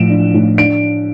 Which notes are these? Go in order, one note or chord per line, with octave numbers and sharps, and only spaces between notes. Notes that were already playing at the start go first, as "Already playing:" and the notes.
Already playing: A2 F3 D7 E7
D4
A2
D4 D7